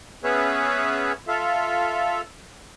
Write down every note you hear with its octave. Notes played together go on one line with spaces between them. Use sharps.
B3 C#4 G#4 B4 C#5 E5
F4 A4 E5 F5